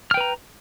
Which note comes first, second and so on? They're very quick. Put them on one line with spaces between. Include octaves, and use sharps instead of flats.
F6 G5 B4 A#5